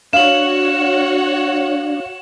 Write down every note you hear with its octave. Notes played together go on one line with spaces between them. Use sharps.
D4 F#4 C#5 F5 F#5 E7 F#7